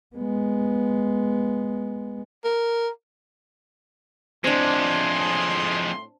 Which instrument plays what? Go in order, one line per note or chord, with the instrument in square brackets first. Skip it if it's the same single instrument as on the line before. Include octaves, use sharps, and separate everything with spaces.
[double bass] G#3 B3
[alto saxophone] A#4
[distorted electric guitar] F2 G#3 [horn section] A2 C6 [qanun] C4 D4